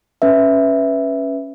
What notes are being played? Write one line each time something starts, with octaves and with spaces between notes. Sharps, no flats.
C#4 B4 E5